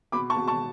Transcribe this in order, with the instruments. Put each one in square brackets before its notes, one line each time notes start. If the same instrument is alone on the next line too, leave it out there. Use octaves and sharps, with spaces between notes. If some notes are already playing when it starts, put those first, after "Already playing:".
[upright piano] B2 B5 D6
A5 C#6
B2
A5 C#6